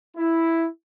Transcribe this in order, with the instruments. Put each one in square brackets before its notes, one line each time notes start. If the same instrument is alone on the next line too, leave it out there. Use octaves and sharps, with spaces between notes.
[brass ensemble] E4